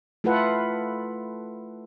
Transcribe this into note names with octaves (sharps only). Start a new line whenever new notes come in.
A3 E4 F4 A4 B4 F#5